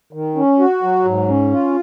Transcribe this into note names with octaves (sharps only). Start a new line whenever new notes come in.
D#3
C#4
F#4
F#3
G#2
C#4
F4